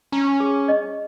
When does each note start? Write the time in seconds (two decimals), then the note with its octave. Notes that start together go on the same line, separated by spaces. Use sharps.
0.12 C#4 A#5
0.40 G#4
0.68 D#5